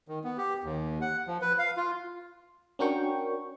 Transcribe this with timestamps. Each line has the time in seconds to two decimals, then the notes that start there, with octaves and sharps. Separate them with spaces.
0.08 D#3
0.24 B3
0.38 G4
0.64 D#2
1.01 F#5
1.27 F3
1.42 B4
1.59 F5
1.77 F4
2.79 C#4 D4 F#4 A#4 G5 C#6